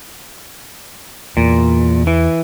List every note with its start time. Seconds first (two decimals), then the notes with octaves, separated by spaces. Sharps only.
1.37 E2 A#2
2.07 E3